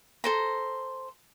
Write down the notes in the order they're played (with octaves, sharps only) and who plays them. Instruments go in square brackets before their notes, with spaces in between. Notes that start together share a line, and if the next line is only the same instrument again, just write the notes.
[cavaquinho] A4 C5 A#5